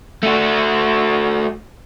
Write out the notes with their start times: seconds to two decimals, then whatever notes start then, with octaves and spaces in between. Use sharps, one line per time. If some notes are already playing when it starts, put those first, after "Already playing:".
0.23 A3 F#4